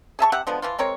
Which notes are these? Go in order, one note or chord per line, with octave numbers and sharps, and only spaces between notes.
G#4 E5 A5 C#6
C3 G4 E5 F#5
D3 F3 G#3 B3
E3 F3 F4
G#3 C4 A#4 C#5